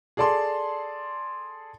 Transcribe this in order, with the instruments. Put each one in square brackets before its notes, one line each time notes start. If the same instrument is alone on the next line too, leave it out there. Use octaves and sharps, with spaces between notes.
[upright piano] G#4 A4 D5 A5 C6